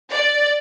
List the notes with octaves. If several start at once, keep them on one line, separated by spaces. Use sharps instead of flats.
D5